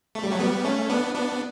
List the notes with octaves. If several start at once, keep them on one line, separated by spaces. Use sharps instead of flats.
A3
G3
F#3 A3
G3 B3
A3 C#4
B3 D4
B3 D4